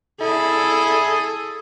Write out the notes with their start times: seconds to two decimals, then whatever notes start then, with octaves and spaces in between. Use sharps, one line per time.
0.21 E4 G#4 A4